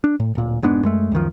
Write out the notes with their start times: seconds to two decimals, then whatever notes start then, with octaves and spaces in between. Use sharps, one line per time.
0.04 D4
0.20 A2
0.35 D1 A#2
0.62 F1 G#2 B3 D4
0.83 F#2 G#3 A3
1.12 C#2 F#2 D#3 F3